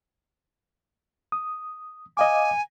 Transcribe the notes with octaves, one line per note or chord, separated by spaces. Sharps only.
D#6
D#5 F5 G#5 D6